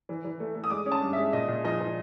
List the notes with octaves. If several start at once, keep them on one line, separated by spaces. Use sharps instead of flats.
E3
E3
A3
A3
D#6
G#3 D6
C#4
A5
G2
G#3 E5
A#2 D#5
A#2
F3 D#5
F3